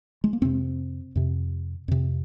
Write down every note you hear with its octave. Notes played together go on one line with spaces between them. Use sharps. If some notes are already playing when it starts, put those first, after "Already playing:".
G#3
A#3
F2 C3 C4
F2 C3
F2 C3